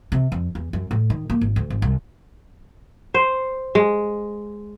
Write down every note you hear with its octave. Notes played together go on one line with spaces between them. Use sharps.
C3
F2
E2
F#2
A2
D#3
A#3
G#1
D2
G#1
C2
C5
G#3